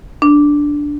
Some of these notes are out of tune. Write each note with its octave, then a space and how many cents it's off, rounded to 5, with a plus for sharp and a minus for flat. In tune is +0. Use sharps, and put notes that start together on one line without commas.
D4 -5